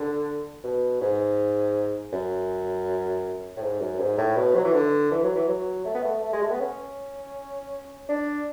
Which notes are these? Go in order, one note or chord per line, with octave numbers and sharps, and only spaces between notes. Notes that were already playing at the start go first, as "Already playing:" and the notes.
Already playing: D3
B2
G#2
F#2
A2
G#2
F#2
G#2
A2
B2
F#3
E3
D3
E3
F#3
E3
F#3
A3
B3
A3
A3
G#3
A3
B3
C#4
D4